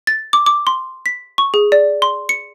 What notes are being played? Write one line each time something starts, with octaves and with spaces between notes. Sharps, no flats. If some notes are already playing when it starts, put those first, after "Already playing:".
A6
D6
D6
C6
B6
C#6
G#4
D5
C6
C#7